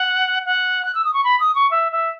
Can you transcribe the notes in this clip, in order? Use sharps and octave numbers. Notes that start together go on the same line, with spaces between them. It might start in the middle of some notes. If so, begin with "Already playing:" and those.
Already playing: F#5
F#5
F#6
E6
D#6
C#6
B5
D#6
C#6
E5
E5